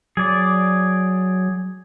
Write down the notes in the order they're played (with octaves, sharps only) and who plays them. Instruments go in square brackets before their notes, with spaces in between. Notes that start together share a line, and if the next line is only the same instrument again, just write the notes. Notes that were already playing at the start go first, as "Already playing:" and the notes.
[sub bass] F#3 [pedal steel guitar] G#4 D5